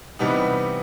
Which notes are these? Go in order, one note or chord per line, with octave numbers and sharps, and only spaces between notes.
C3 E3 G3 B3 D#4